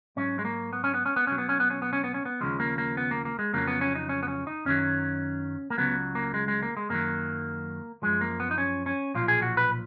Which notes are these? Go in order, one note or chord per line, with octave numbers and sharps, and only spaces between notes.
G#2 F#3 C#4
G#3
A#3
B3
C#4
B3
C#4
B3
B1 B2 F#3 C#4
B3
C#4
B3
C#4
B3
C#4
B3
C#4
B3
D#2 C#3 F3 G#3
A#3
A#3
B3
A#3
A#3
G#3
F2 C#3 F#3 A#3
B3
C#4
D#4
C#4
B3
C#4
D#4
F#2 D#3 F#3 C#4
A#3
C#2 C#3 F#3 B3
A#3
G#3
G#3
A#3
G#3
F#2 D#3 F#3 A#3
F#2 F3 G#3
A#3
B3
D#4
C#4
C#4
B1 A#2 F3 F4
G#4
F#4
B4